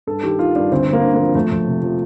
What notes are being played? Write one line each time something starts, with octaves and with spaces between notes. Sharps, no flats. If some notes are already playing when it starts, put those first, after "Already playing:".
G2 A4
D#3 G4
D#3 F4
G2 D4
D2 C4
D2
A#3
D3
F3 A#3
F2 A3
F2
C3
F3